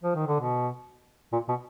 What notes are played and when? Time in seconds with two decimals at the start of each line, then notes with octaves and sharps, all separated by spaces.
0.04 F3
0.15 D#3
0.27 D3
0.40 B2
1.32 A#2
1.49 B2